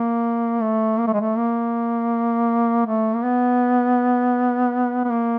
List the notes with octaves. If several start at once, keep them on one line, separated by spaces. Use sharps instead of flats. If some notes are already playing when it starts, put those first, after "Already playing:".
Already playing: A#3
A3
A#3
A3
G#3
A3
A#3
A3
A#3
B3
B3
A#3